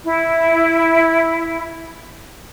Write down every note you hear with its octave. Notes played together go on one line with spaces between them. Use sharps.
E4